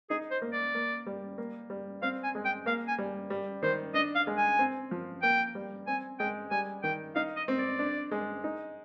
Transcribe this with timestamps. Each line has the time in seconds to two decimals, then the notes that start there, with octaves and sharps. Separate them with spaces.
0.10 D#4 G#4
0.31 C5
0.42 A#3
0.53 D5
0.75 A#3
1.06 G3
1.38 A#3
1.70 G3
2.02 C4 F5
2.23 G#5
2.35 G#3
2.45 G5
2.66 A#3 F5
2.88 G#5
2.98 G3
3.30 G3
3.63 D#3 C5
3.94 D4 D#5
4.15 F5
4.27 G#3
4.37 G#5
4.59 C4
4.91 F3
5.23 A#3 G5
5.55 G3
5.87 C4 G#5
6.19 G#3 G5
6.51 G3 G#5
6.83 D#3 G5
7.15 D#4 F5
7.36 D#5
7.48 C4
7.58 D5
7.79 D4
8.11 G#3
8.44 D#4